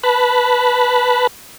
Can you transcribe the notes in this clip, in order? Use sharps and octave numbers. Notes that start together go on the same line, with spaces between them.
B4 A5 B5 F#6